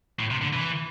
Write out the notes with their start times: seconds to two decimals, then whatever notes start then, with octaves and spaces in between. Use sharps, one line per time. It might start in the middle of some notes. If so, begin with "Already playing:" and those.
0.20 A2
0.31 C3
0.42 D3
0.53 E3